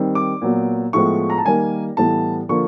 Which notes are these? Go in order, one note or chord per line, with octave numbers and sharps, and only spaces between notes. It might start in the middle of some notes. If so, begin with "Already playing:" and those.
Already playing: D#3 G3 C4
D6
A#2 F#3 B3
A2 F3 G#3 B3 C#6
A#5
A5
D#3 G3 A#3 G#5
A2 E3 G3 B3 A5
D3 F3 A#3 C#6